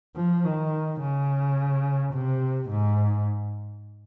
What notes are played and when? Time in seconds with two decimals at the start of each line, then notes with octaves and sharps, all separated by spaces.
0.16 F3
0.45 D#3
1.01 C#3
2.15 C3
2.70 G#2